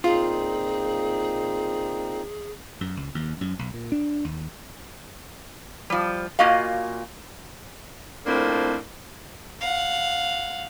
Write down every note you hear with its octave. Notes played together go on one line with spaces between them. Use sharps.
A#2 C4 D#4 F4 G#4
F#2
C#2
D#2
F#2
B1
A#2
D4
D#2
F3 G3
A#2 A#3 F#4 D#5 F5
F2 A2 A#3 C4 D4
F5 F#5